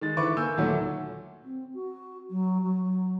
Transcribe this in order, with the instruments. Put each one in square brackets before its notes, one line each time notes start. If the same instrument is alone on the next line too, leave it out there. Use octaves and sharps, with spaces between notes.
[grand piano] D#3 G#3 A6
D3 E3 B4 E5 C#6 D6
A#3 G#5 E6 G6
D2 A#2 D#3 F#3 A3
[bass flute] C4
F#4
F#3
F#3